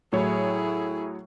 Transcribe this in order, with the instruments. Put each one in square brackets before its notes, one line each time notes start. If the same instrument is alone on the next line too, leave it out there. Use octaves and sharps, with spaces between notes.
[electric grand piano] A2 F#3 C#5 [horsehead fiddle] E4 G#4